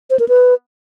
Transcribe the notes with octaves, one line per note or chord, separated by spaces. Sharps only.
C5
A#4
B4